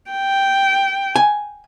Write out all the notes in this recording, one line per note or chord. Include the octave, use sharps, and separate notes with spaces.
G5
G#5